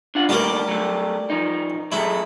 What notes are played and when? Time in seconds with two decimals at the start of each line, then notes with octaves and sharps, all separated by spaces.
0.15 D4 F4 F#5
0.29 D#3 G3 A3 A#3 G4 A#4
0.68 F#3 A3
1.30 F3 D#4
1.92 F#3 G#3 A3 E4